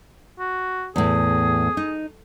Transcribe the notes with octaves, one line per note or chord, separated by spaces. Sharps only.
F#4
E2 A2 G#4
D#4